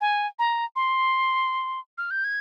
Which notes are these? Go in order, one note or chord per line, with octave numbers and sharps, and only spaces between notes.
G#5
A#5
C6
F6
G6
G#6